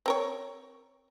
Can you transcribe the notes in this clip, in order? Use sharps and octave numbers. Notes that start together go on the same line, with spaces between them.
C4 A#4 C#5